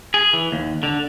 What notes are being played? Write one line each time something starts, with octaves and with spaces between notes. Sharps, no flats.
G#4
E3
D#2
D3